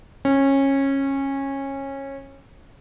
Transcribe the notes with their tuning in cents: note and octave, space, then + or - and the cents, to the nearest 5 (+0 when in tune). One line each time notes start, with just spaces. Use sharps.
C#4 -20